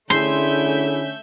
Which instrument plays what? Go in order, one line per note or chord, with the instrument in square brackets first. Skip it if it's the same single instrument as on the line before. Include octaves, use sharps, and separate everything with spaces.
[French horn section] D3 C#4 [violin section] A3 E5 G6 [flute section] E4 G#4 [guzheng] C6